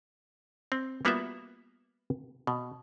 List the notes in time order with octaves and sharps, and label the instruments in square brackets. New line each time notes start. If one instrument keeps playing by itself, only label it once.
[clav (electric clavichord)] C4
G3 A#3 B3 F4 F#4 E5
B2